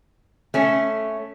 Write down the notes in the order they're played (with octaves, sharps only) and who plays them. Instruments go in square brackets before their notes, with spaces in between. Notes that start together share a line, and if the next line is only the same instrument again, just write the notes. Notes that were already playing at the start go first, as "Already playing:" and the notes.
[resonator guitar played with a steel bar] A3 C#4